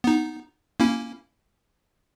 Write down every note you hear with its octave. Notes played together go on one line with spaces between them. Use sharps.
B3 D#4
A#3 C#4 E4